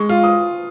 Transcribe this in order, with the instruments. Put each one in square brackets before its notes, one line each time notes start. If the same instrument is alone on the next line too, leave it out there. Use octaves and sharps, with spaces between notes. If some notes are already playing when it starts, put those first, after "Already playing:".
Already playing: [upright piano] G#3 [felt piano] C#6
[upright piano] F4
[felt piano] D#6